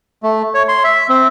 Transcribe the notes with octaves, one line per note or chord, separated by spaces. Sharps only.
A3
C#5
C6
E5
C4